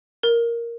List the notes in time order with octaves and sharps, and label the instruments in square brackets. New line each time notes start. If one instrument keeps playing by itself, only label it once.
[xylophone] A#4